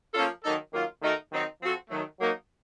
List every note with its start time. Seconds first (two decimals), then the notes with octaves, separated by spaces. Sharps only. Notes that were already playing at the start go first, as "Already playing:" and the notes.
0.14 F3 A#3 C#4 F4 A4
0.44 D#3 F#3 A#3 D#4 A4
0.73 D#3 F#3 A#3 F4
1.02 D#3 A3 D#4 F#4 A#4
1.32 D#3 F#3 C4 D#4
1.61 F3 C4 F#4 A4
1.90 D#3 F#3 A3
2.19 F#3 A#3 D#4